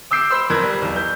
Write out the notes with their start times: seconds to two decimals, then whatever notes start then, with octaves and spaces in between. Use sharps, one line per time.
0.11 D6 E6 G6 C7 D7
0.30 C5 B5 C6 E6
0.50 F2 A#4 F#6 G#6
0.62 G3
0.82 B1 E2
0.96 G6